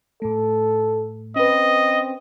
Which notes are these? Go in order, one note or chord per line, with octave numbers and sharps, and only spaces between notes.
A2 A3 A4
C4 C#4 B4 D#5